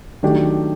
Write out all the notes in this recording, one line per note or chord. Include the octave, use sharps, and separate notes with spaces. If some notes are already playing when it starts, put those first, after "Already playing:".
D#3 F#3 A3 D4 G4